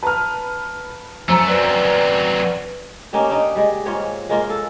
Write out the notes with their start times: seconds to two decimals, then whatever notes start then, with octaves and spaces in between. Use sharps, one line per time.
0.03 B4 A5 A#5 F6
1.28 F#2 A3 C5 A#5 E6
1.48 F#3 C4 B4 D5
3.13 A#3 C#4 D#4 G4
3.30 D4 D#4
3.55 G3 G#3
3.86 G#2 F4 C#5
4.29 G#3 A#3 F4
4.50 A4